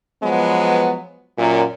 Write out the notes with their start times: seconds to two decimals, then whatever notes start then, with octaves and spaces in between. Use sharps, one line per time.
0.23 F3 F#3 G#3 B3
1.38 F#2 A#2